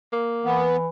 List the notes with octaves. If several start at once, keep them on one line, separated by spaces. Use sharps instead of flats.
A#3
E3 B3